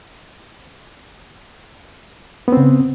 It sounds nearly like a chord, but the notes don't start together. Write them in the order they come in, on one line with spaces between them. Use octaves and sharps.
B3 C4 C#3